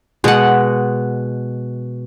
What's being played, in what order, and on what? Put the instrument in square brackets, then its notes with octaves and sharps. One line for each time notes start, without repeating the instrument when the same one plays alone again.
[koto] B2 [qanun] G#3 F#5